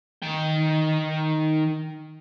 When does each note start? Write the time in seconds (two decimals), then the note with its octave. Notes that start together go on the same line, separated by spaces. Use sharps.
0.23 D#3 G5